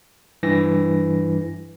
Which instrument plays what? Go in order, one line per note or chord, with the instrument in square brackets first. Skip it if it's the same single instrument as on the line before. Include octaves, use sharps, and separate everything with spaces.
[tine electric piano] G2 E3 A#6